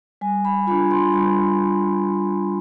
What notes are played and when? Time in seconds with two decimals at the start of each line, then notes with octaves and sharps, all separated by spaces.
0.21 G3 G#5
0.45 B5
0.67 D4 F4 B5
0.91 C6
1.13 G3 B5